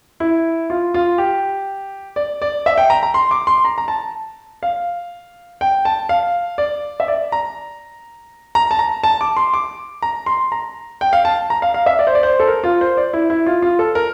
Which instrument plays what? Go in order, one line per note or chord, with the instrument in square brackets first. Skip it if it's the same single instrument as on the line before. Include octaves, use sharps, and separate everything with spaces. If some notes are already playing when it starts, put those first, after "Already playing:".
[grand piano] E4
F4
F4
G4
D5
D5
E5
G5
A#5
A#5
C6
D6
C6
A#5
A#5
A5
F5
G5
A5
F5
D5
E5
D5
A#5
A#5
A5
A#5
A5
D6
C6
D6
A#5
C6
A#5
G5
F5
A5
A#5
F5
F5
E5
D5
C5
D5
C5
A4
A#4
F4
C5
D5
E4
E4
F4
F4
A4
A#4